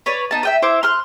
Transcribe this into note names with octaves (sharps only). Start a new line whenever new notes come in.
B4 C#5 D5
B3 D#4 A5
E5 G5 D#6
E4 C5 E5 D6
C6 F6 F#6